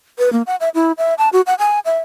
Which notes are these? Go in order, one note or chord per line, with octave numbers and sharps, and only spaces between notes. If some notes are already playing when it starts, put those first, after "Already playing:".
B4
A#3
F#5
E5
E4
E5
A5
F#4
F#5
G#5
E5